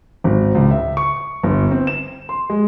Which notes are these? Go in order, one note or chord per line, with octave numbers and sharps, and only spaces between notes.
G#1
C#2
E5
C#6
G1
C4
E7
C6
G#3